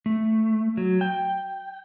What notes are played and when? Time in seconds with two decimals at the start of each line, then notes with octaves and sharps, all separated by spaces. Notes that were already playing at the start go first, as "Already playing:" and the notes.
0.06 A3
0.77 F#3
1.01 G5